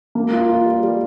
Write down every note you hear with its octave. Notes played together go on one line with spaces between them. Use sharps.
A#3
F4
F4
G3
G3